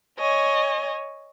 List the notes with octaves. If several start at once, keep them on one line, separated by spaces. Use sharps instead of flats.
C#5 D#5 G#5